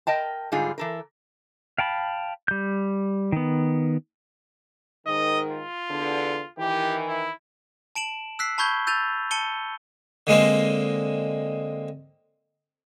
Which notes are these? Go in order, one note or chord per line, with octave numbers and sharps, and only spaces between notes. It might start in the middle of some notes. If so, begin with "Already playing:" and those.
A#4 D#5 G5 A5
G#2 D3 G3 F4 G#4
E3 A4 A#4
F5 G5 A5 B5
G3 G6
D#3 B3
G#2 D#3 D#5
F4
E2 D3
D#3 E3 G4
E4
A5 D7 E7 F#7
E6 F#6 B6 C7
A5 B5 C#6 G6 G#6 G7
E6 G6 A6 D#7 F7
A5 C#7 D#7 G7
D3 G#3 A#3 C4